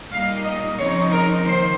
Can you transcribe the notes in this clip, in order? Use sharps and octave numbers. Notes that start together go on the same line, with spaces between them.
A#2 G3 A#3 D#4 F5
D#5
C#3 F3 C4 D#4 C#5
A#4
D#3 A#3 C5